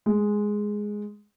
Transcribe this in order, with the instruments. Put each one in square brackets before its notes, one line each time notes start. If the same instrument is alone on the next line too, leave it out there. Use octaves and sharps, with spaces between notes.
[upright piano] G#3